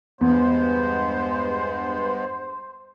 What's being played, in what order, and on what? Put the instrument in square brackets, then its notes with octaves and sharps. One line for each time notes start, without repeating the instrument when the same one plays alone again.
[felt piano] E2 [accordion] G2 G#3 B3 [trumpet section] C5